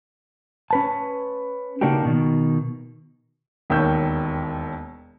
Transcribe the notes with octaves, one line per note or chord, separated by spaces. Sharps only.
C#4 B4 A5
C#3 A#3 D4 D#4 F#4 G4
B2 D#3
E1 D#2 D#3 C#5 E6 G6